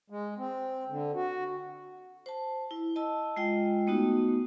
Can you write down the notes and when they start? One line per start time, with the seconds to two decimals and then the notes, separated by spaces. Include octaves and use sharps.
0.10 G#3
0.37 C4
0.89 D3
1.15 F#4
2.26 C5 A5
2.71 E4
2.96 D#5 A5 E6
3.36 G#3 F4 D#5 G5
3.87 A3 B3 D#4 F#4